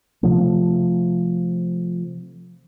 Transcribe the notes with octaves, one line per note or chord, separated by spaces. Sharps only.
C3 F3 A3